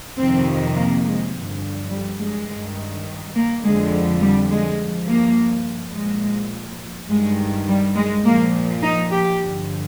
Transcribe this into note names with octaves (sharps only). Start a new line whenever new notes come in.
F2 C3 D#3 C4
A#3
G#3
G2 D3 F3
G3
G#3
G2 D#3
A#3
F2 D3 F3 G#3
G3
G#3
G2 F3
A#3
A#2 F3 G#3
G2 D#3 G#3
G3
G#3
A#2 F3 A#3
D#4
G4
G2 D3 F3